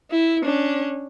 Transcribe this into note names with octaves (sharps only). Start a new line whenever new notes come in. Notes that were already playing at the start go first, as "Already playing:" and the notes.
E4
C#4 D4